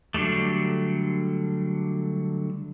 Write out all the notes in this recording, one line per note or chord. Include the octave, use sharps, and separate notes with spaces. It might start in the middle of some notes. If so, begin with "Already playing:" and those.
D3 F#3 G3 A3